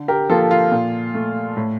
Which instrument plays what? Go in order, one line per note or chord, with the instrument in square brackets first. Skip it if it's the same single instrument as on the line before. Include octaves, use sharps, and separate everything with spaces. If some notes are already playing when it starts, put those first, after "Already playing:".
Already playing: [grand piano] D3
G4 A#4
F3 A#3 F4 A4
F4
A#2
A3
A2